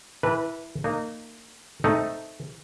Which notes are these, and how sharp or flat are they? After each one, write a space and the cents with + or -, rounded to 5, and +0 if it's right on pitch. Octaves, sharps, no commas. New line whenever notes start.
E3 +0 B4 -20 A5 +30
A#3 -20 D#4 -25
A3 +0 C4 +0 D#4 +0